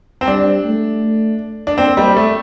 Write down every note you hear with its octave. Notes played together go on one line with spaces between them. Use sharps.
C4
G3 D4
A3
D4
A#3 C4
G3
A3